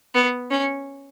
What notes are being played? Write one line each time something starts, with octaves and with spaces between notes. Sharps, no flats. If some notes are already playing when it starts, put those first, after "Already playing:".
B3
C#4